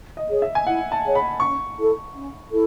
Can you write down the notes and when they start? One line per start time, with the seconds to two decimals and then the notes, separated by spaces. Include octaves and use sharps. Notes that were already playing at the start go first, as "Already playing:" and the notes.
0.17 D#5
0.29 G#4 C#5
0.42 E5
0.55 G#5
0.67 E4 F#5
0.92 A5
1.03 G#4 C#5
1.15 B5
1.40 C#4 C#6
1.78 E4 A4
2.14 C#4
2.52 E4 A4